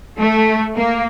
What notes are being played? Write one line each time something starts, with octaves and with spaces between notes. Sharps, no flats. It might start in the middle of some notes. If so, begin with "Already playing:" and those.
A3
A#3